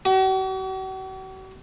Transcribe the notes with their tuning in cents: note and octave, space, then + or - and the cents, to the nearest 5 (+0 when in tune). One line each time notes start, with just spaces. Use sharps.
F#4 +45